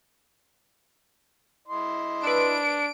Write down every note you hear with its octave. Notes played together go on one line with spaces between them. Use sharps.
E4 D#5 C6
D4 B4 E6 D7